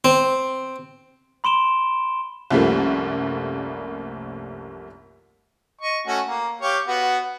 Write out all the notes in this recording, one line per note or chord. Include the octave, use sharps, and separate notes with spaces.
C4
B5 C6 D7 E7 G7
C2 F#2 F3 G3 A3 A#3
D#5 C#6
A3 C#4 F#4
A#3
G4 C#5 F5
B3 F#4